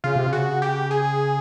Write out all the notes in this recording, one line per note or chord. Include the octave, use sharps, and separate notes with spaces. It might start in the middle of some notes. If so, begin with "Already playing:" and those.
C#3 F4
C3
C#3
F#4
G4
G#4